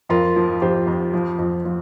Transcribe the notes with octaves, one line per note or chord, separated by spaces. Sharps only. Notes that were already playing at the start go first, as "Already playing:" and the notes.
F2 F4 A#4
F3
F2 G4 C5
F2
F3
F2
F3